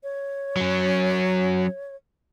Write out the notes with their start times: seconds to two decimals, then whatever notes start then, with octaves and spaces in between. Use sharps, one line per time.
0.03 C#5
0.57 F#3 C#4